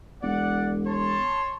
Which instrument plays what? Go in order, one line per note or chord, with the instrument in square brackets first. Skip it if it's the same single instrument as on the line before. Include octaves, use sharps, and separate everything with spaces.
[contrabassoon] E1 [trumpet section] D5 F#5
[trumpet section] C#5 A5 C6